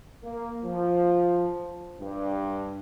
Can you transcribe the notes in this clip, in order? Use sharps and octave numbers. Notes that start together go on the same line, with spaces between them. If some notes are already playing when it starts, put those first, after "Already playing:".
A#3
F3
G2